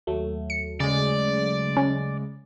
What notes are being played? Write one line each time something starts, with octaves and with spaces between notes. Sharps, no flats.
D#2 F#3 A3
C#7
C#3 G#3 D5
C#4